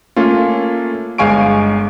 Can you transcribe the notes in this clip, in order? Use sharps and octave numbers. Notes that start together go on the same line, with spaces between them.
A3 A#3 C#4 F4
G1 G#3 F5 G#5 C#6 D7